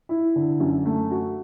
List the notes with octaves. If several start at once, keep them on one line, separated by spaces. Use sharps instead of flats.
E4
D3
F#2
A3
F#4